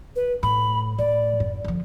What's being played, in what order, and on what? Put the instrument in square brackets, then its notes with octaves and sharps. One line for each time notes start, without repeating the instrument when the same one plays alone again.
[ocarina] B4
[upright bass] A2 [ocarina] B5
[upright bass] A2 [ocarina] D5
[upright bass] F#2
D3 F3